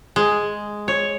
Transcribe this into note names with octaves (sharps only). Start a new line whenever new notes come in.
G#3
C#5